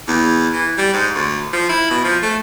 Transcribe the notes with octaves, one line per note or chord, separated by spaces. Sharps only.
E2
E3
G3
G#2
D2
F3
E4
B2
F3
A3